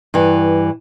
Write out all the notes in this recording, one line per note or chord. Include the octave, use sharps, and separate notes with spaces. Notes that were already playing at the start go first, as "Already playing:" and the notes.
G2 E3